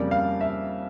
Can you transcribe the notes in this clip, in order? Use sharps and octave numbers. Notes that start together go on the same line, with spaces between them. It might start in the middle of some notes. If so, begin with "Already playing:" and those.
Already playing: F2 C#3 G3 A#3 D5
F5
E5